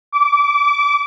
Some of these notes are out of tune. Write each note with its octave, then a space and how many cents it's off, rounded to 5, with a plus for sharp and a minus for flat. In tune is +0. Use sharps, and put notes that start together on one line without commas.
D6 -25